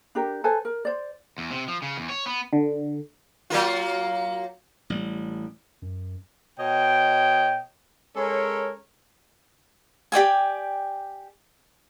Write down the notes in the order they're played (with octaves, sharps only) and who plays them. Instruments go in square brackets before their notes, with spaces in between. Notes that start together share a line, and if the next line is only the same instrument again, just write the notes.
[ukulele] D4 G4 A#4
A4 B4 C5 G#5
A#4
C5 D5
[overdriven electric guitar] E2
C3
F3
C#3
E2
C#5
B3
[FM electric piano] D3
[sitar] F#3 A#3 F4
[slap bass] A1 G3
[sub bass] F#2
[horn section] B2 C#5 D#5 G5
G#3 C#4 A4 A#4 C#5
[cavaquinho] G4 D5 G5 G#5